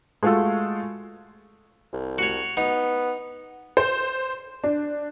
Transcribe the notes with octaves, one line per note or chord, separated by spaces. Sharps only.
G#3 A3 F4 F#4 A4
C2
F#4 C#5
B3 D#4
C5
D4